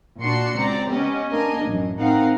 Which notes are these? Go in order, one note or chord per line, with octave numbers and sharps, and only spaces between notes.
A#2 D4 F#4 C6 C#7
C#2 C4 D5 A#5
B3 C#4 G4 D#5
A#3 D4 A#4 D#5 G#5
A1 F#2
C4 D#4 A#4 F5 F#5